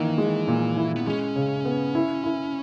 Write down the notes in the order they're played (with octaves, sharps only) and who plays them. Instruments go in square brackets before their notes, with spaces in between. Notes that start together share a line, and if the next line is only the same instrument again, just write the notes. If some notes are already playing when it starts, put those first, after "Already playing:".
Already playing: [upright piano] D#3 A#3 [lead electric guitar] E3
[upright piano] G#3
A#2
E4
[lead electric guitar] B3
[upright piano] G#3 [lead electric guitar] C#4
[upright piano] C#3
B3
E4
E4